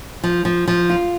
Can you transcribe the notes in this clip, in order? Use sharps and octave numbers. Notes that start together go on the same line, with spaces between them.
F3
F3
F3
F4